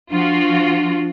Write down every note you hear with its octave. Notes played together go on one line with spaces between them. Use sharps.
F3 D4 F4 F#4